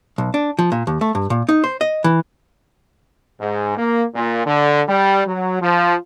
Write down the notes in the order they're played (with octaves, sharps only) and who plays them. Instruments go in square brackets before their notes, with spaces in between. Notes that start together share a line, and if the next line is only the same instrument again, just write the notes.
[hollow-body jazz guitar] B1
D4
F3
A#2
D#2
A3
G2
A#2
D#4
C5
D#5
E3
[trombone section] G#2
A#3
A#2
D3
G3
F#3
F3